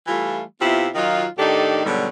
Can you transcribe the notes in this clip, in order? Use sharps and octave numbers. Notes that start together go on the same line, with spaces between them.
E3 G3 A3 F4
C3 B3 E4 F4
D#3 F#3 D#4 F4
A2 D#3 D4 D#4 G4 A4
G#2 B2 D3 F#3 G3